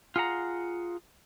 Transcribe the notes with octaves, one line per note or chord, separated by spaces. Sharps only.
F4 G#4 F#5 A#5